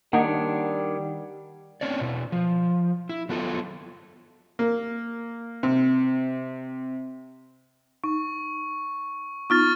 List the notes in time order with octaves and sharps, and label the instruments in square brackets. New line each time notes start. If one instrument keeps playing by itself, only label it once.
[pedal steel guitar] D#3 D4 C#5 [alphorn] G3 [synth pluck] A#3 D#4 [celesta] F#5
[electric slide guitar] C4 C#4 C#5 D5
B2 E4
F3
E4
F#3 B3 F4 A4
[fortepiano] A#3
C3
[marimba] D#4 [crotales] C#6
[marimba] B3 D#4 F4 [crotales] C#6 F6 A6